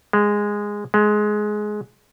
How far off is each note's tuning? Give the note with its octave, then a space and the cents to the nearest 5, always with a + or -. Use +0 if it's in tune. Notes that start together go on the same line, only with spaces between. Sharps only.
G#3 -10
G#3 +15